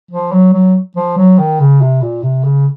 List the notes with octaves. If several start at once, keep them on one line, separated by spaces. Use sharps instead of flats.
F3
F#3
F#3
F3
F#3
D#3
C#3
C3
A#2
C3
C#3